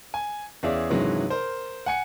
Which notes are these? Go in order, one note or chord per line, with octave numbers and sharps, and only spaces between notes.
G#5
E2 C#4 G#4 D5 E5 F5
G2 C3 D#3 E3 F#3 G#3
A#4 C5
F#5 G#5 C#7